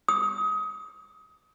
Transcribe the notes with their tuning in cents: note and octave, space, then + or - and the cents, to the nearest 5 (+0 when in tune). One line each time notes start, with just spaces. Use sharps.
D#6 +25